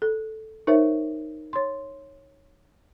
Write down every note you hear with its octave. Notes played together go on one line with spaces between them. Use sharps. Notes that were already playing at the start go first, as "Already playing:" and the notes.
A4
D#4 A#4 C5 C#5 E5
C#5 C6